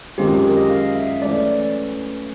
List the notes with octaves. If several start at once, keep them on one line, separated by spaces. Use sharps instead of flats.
F#2 D#3 G#3 C4 F4 G4
G4
A#4
D#5
F5
E5
E3 A3 C#4 D5